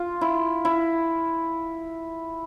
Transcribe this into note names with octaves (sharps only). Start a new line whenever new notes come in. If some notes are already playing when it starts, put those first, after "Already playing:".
Already playing: F4
E4
E4